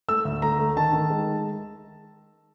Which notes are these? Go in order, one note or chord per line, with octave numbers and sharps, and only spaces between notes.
A3 E6
D2
A3 A#5
A3
D#3 A5
D#3
G#3